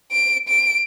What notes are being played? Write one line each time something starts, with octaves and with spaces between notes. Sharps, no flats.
D7
D7